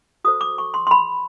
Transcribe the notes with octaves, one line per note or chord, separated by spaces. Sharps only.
F#4 A4 C5 D#6
D6
C#6
C6
C6
B5